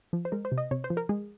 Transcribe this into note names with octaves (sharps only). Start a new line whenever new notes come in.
F3
C5
G#3 A#4
C5
C3
D#5
C3 C#5
C5
F3
A#4
G#3 G#4